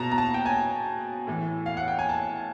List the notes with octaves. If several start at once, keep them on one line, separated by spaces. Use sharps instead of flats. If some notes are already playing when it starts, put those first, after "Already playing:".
Already playing: B2 A5 A#5
A#5
A5
G5
G#5
A2 E3
F5
F#5
G5
G#5
A5